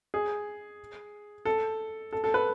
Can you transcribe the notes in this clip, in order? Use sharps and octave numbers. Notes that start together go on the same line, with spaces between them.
G#4
A4
A4
A4
B4